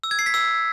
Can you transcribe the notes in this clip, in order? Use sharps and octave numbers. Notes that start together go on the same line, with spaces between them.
E6
G#6
C7
B6
E6